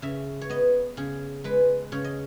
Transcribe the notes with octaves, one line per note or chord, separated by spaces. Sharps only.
C#3 E5
C#5
B3 D#5
C#3 G#4
G#3 B4
C#3 C#5
D#5